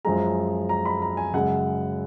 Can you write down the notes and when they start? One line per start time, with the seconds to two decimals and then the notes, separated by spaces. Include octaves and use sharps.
0.05 F#2 F3 G#3 A#5
0.69 A#5
0.85 B5
1.02 A#5
1.17 G#5
1.34 F#2 C#3 G#3 F#5